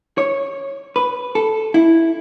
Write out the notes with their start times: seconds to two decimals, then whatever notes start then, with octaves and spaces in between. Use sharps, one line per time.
0.18 C#5
0.96 B4
1.35 A4
1.74 E4